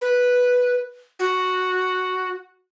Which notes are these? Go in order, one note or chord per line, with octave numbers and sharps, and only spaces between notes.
B4
F#4